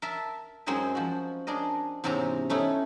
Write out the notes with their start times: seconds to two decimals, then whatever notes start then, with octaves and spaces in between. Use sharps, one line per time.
0.02 A#4 E5 A5
0.66 F#2 G#3 C4 D#4 D#5 G#5
0.95 F3 F#4
1.47 D4 G#4 A#4 D#5
2.04 E2 G#2 C3 C4 C#4 A#5
2.50 A3 C#4 D#4 E4